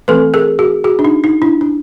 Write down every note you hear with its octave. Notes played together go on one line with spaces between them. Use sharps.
E3 A3 C4 A4 B4
G#4 A#4
F#4 G#4
F#4 G#4
D4
D#4
D#4
D4 E4
D4